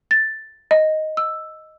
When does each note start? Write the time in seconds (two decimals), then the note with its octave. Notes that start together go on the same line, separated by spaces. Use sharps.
0.11 A6
0.71 D#5
1.17 E6